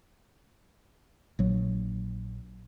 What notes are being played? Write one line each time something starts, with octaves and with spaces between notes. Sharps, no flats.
A#1 F#3